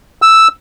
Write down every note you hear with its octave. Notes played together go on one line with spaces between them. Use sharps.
E6